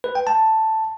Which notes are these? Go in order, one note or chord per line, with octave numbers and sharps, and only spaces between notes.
B4
G5
A5